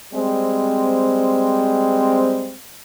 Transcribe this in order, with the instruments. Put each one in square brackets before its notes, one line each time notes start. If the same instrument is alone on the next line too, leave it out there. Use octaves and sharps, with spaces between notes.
[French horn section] G3 G#3 C4